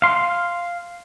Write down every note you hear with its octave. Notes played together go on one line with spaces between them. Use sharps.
F5 C6